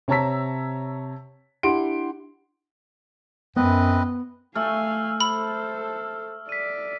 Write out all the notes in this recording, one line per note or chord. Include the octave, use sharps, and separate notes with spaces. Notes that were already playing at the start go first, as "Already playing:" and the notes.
C3 C#5 A5 A#5 E6 B6
D4 E4 G4 F#5 C6 D7
F#2 B3 C4 B4 D#5
A3 F5 G#5 E6 F6
A4 C5 B5
D5 B6 D#7